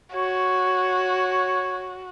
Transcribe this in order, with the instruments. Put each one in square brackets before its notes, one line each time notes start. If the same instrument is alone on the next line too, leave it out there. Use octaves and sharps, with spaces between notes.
[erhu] F#4 [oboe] C#5